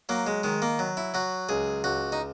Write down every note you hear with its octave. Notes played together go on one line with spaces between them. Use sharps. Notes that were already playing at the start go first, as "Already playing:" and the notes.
F#3 A#3
G#3
D#3 G#3
A#3
F#3
E4
F#3 F#4
C#2 G#4
C#2 F#4
D#4